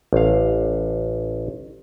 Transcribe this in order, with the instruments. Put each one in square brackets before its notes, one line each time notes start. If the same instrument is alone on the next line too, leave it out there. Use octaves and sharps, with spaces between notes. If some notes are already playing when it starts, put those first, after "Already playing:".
[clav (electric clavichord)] A1 F5